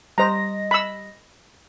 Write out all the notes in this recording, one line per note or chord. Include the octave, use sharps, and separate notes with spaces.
G3 C5 D#5 A#5 A#6
B5 E6